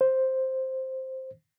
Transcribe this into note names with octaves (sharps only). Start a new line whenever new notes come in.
C5